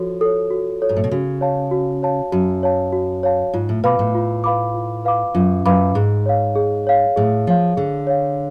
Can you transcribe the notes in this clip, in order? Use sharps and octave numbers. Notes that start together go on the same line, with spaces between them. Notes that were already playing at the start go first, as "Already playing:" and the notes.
Already playing: F3 F#4 A4 C#5
A4 C#5
F#4
A4 C#5
G#2
A2
B2
C#3 F#4
C#5 F5 A5
F#4
C#5 F5 A5
F#2 F#4
C#5 F5 A5
F#4
C#5 F5 A5
G#2 F4
A2
B2 B4 F5 B5 D6
A2
F4
B4 F5 B5 D6
F4
B4 F5 B5 D6
F#2 F4
F#2 B4 F5 B5 D6
G#2 G#4
C#5 F5
G#4
C#5 F5
A2 G#4
F3 C#5 F5
D3 G#4
C#5 F5